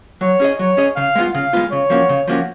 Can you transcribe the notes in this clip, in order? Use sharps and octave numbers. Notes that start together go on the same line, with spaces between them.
F#3 C#5
C#4 G#4 D#5
F#3 C#5
C#4 G#4 D#5
C#3 F5
G#3 B3 F4
C#3 F5
G#3 B3 F4
C#3 C#5
F3 A#3 C#4 F#4
C#3
F3 A#3 C#4 F#4